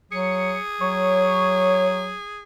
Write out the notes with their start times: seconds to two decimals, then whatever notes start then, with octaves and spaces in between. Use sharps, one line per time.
0.12 F#3 G#4 C#7
0.81 F#3 C#5